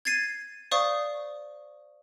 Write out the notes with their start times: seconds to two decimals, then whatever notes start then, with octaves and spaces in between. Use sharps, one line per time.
0.05 G#6 A6 C7 D#7
0.71 C5 D5 F5 C#6 D#6